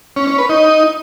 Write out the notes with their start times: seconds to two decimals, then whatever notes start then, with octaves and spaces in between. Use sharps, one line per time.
0.16 C#4
0.27 C#4
0.38 B4
0.49 D#4